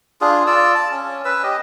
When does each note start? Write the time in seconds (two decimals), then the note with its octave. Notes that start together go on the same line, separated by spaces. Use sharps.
0.21 D4 F4 G#4
0.47 F4 D5 E6
0.75 A5
0.91 C#4
1.25 C#4 B4 E6
1.43 G4 D#5